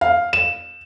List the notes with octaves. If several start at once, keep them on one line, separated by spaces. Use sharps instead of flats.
F5
E7